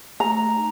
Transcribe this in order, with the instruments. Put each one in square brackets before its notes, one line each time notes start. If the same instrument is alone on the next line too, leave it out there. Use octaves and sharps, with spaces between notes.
[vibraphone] A3 [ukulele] A#5
[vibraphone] D#4